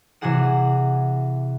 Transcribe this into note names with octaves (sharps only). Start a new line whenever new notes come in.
C3 E3 F#4 G#4 F#5 E7